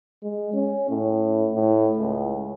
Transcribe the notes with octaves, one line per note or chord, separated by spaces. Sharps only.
G#3
C#4
A2
A2
C#2